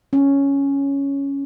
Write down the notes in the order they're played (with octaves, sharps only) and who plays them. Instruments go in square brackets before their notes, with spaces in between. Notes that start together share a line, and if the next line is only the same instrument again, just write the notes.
[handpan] C#4